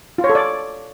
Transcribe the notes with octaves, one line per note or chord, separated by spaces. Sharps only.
F4
C#5
A4
D5